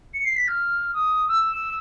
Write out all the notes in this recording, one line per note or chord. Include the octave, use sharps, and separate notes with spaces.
C#7
C7
B6
F6
D#6
E6